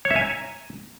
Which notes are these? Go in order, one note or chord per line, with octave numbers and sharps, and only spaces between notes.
C#5
E5
G#5
A#5